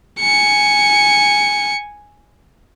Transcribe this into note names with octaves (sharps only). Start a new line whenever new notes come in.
G#5 C#7